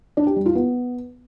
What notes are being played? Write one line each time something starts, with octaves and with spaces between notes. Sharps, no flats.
D4
G4
G3
F4
B3